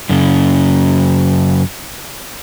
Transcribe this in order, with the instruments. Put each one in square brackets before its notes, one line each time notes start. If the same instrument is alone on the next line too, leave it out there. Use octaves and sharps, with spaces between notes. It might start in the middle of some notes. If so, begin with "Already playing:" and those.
[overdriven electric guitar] F#2 C#3